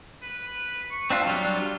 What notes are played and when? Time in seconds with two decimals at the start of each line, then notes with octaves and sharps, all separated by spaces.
0.22 B4
0.91 C#6
1.10 C4 D4 F4 E5
1.27 F#3 G3 D4 F4